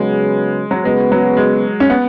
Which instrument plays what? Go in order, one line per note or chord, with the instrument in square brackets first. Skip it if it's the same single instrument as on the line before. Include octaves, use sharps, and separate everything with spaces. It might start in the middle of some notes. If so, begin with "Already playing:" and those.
Already playing: [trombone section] C#3 F#3 B3 G#4 [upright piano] G#3
[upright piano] F#3
[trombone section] C#3 B3 F#4 B4 [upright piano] G#3
[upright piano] F#3
G#3
C#4
B3